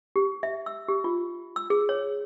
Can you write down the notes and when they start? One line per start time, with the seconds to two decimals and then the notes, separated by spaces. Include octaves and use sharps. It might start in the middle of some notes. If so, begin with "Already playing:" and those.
0.16 G4
0.43 E5
0.66 E6
0.88 G4
1.04 F4
1.56 E6
1.70 G#4
1.89 C#5